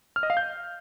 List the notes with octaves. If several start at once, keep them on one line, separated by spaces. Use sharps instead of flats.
F6
D#5
F5
G6